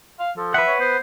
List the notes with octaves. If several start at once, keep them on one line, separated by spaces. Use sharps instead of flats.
F5
F3 A4
B4 E5 F#5
C#5
B3 C5